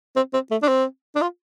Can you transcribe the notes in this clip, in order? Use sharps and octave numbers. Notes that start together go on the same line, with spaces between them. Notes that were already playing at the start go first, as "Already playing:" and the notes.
C4
C4
A3
D4
C4
D4
F4